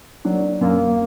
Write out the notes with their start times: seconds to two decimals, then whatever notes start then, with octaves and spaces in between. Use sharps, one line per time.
0.25 F#3 A#3 D4
0.61 F#2 A#3